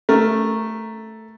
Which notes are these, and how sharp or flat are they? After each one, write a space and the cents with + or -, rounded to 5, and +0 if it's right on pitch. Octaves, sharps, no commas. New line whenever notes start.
A3 +0 A#4 +0